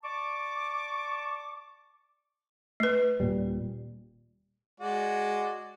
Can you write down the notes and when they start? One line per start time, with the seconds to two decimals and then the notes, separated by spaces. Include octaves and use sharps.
0.03 D5 A5 C#6 D6
2.80 A3 B4
3.20 D#1 A#2 G3
4.80 G#3 F#4 D5